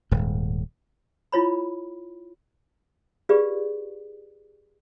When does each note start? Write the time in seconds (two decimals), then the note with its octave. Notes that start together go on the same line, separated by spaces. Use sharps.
0.11 D#1 G#2
1.32 E4 F4 C#5 B5
3.29 F4 G4 G#4 B4 D5 F5